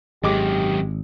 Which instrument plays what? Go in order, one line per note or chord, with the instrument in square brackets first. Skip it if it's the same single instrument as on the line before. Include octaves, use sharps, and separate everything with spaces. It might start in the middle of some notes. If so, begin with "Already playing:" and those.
[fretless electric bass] G#1 [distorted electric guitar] F#2 D#3 [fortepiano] G#3 D6 [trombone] G4